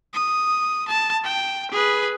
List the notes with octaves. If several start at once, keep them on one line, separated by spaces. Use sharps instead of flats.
D#6
A5
G5
G#4 B4